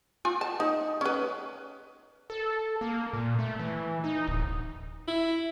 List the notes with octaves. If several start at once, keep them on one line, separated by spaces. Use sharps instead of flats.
F4 G#5
A5
D#4
C#4 B4
A4
A#3
A#2
A3
E3
D#4
D1
E4